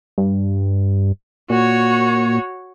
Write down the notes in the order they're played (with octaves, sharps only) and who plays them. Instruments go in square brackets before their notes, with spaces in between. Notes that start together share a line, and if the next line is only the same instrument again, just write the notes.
[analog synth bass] G2
[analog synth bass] A#2 [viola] F#4 C#5